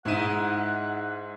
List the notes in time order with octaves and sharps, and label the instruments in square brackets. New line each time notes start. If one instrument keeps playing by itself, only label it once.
[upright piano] G#2 D#7 [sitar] G#3 D#4 E4 [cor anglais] F#5